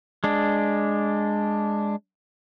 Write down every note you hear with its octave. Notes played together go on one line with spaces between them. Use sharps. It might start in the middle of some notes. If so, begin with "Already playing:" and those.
G#3 D4